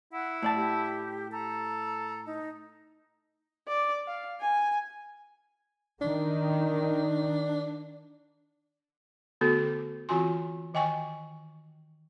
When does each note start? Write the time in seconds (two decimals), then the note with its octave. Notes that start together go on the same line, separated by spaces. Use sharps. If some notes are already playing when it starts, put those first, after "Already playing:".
0.13 E4 F#5
0.43 A2 D5 A5
0.56 G4
1.32 A4 A#5
2.26 D#4
3.68 D5
4.07 F5
4.41 G#5
6.01 D#3 D4
9.41 D3 A3 B3 F#4 A4
10.09 E3 C4 F4 F#4 G#5 C6
10.74 D#3 D#5 G5 G#5 C#6